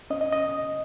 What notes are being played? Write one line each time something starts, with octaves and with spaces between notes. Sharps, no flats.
C#4 D#5
D#5
D#5